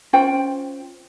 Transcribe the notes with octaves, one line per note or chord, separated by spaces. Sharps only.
C#4 F4 C5 G5